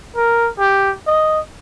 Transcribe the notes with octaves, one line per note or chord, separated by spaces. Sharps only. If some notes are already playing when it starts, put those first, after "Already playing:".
A#4
G4
D#5